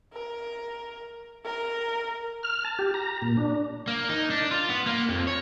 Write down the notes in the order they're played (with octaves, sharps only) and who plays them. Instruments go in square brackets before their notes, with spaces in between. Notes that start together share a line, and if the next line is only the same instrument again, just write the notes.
[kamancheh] A#4
A#4
[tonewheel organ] F6
A5
G4
A#5
A#2
D4
[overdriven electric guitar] A#3
D#4
D4
F4
B3
A#3
F2
C#5